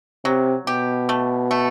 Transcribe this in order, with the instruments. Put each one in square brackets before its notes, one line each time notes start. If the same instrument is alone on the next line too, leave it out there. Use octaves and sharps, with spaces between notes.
[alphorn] C3 [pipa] F#3
[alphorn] B2 [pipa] G4
[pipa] A3
A3